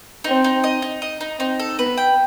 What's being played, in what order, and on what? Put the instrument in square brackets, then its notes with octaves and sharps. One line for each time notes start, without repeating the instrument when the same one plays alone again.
[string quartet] C4 [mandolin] D#4
[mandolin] D#4
D#5
D#4
D#5
D#4
[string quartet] C4 [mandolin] D#4
[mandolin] A4
[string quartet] B3 [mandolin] B4
[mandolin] G5